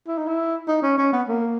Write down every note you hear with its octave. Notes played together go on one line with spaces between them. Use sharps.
E4
D#4
E4
D#4
C#4
C#4
B3
A#3